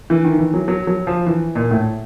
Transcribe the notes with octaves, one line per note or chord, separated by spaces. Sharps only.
E3
D#3
E3
F#3
F#3
F#3
F3
E3
A#2
A2